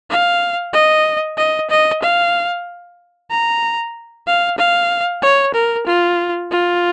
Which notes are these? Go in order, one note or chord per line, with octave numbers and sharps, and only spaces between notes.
F5
D#5
D#5
D#5
F5
A#5
F5
F5
C#5
A#4
F4
F4